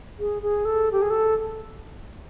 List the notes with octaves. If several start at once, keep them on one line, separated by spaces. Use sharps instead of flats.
G#4
G#4
A4
G4
G#4
A4